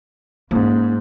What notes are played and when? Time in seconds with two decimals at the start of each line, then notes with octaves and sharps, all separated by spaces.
0.51 G#2 A#3 C#4